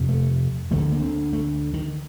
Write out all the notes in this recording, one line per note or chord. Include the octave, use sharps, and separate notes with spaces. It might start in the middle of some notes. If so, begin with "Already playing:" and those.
Already playing: F2 C3
A3
D2 D3 A3
A#3
C4
A3
D#3